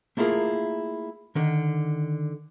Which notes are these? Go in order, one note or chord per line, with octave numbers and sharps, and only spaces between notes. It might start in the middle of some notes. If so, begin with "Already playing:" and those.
A3 A#3 E4 F4 G#4 A#4
D3 D#3